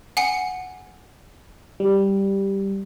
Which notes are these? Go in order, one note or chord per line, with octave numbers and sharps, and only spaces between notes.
F#5 G#5 C#7
G3